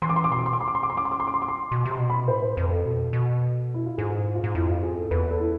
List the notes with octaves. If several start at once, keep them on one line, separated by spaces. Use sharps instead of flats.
E3 C6
D6
C6
D6
B2 C6
D6
C6
D6
C6
D6
C6
D6
C6
D6
C6
D6
C6
D6
C6
D6
C6
B2
C3
C6
B2
B5
A2 C5
C5
F2 B4
A4
B2
B2
E4
F4
G#2 G#4
G#4
F4
F4
G#2
F2 E4
F4
G#4
A4
E2 B4
A4
E4